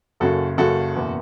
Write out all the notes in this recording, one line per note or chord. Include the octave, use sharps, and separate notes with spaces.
F#1 F#2 C#3 F#4 A4
F#1 F#2 C#3 F#4 A4
F#1 E2 B2